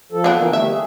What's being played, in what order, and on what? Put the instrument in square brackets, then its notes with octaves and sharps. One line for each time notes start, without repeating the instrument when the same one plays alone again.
[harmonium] F3 A4
[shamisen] B3 D4 F4
[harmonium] D3 E3 A#3
[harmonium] G3 A3 [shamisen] E5
[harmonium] G#4